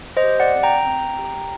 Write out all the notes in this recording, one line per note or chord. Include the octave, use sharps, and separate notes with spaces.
C5 D#5
G4
D5 F#5
C4
G5 A#5
C4
G4